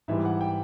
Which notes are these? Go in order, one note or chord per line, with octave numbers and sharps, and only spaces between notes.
G#2 E3 G3 E5
F#5
G5